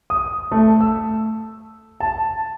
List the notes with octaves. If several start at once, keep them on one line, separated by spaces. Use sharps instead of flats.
D#6
A3
E6
A5